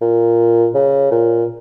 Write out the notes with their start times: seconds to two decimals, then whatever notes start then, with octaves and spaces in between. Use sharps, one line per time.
0.02 A#2
0.74 C#3
1.11 A#2